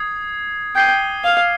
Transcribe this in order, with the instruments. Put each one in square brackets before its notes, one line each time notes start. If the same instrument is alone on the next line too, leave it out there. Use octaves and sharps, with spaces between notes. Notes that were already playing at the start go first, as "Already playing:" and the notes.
Already playing: [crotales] D#6 G#6 C7
[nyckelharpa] G5 [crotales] D6 G#6 C7 D#7 G7
[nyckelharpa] F5